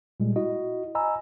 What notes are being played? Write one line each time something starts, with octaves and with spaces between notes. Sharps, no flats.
A#2 G3 G#3
E4 F#4 D#5
D#5 G#5 A#5 B5 E6